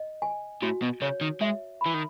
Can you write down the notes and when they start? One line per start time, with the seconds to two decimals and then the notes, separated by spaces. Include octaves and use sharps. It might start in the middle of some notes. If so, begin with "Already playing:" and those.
Already playing: D#5
0.22 G#5
0.62 A2 F#4
0.82 B2
1.01 C#3 C#5
1.21 D#3
1.41 G#3 E5
1.81 E3 B5
1.94 D#3